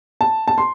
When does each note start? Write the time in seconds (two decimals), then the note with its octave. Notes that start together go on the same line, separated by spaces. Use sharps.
0.21 A5
0.48 A5
0.58 C6